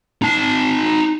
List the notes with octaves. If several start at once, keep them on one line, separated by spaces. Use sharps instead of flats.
D#4 A5